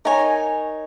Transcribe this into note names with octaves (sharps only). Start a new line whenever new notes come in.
D#4 A#4 C#5 G#5